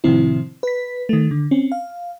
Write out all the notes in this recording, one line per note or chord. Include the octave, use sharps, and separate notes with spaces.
A2 C3 D#3 F3 C4 E4
B4 B6
D#3 A3
D3
C4 C#4
F5